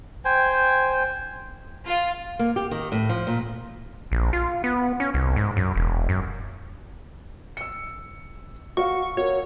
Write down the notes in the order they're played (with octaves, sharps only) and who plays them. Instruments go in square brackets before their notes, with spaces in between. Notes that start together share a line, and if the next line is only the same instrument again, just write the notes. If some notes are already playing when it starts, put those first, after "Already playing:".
[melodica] C5 G5 G#5
[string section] F4
[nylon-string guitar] A#3
G4
D#3
A2
F3
A#2
[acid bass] A#1
F4
B3
C#4
C2
G#2
F#2
E1
F#2
[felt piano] E6 C#7
[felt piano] F#4 F5 [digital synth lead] C#6
[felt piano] F#4 A#4 [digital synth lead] C#5